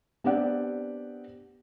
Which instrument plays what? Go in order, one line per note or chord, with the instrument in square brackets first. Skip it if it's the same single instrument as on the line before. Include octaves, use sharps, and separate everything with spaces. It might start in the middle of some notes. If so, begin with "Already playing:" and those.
[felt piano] B3 C4 D4 G4 D5 F#5